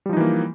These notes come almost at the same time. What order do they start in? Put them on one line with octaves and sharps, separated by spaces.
G3 F3 D#4 E3 A#3